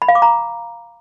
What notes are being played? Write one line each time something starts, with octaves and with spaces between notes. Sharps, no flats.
B5
F5
D6
A#5